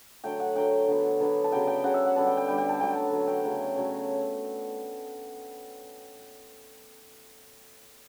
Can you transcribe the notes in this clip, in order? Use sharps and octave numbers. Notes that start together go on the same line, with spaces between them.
D3 F#3 A3 G5
F#5
D3 F#3 A3 G5
D3 F#3 B3
D3 F#3 B3
A5
C#3 F#3 B3 G5
G5
C#3 F#3 B3 F#5
E5
F#5
D3 G3 B3 A5
G5
G5
D3 G3 B3 G5
G5
A5
D3 F#3 A3 G5
A5
D3 F#3 A3
G5
C#3 F#3 A3
C#3 F#3 A3